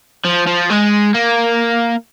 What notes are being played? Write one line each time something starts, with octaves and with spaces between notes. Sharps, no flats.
F3
F3
G#3
A#3